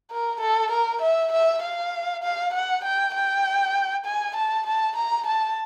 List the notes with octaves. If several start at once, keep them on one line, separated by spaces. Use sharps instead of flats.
A#4
A4
A#4
E5
E5
F5
F5
F#5
G5
G5
G#5
A5
A5
A#5
A5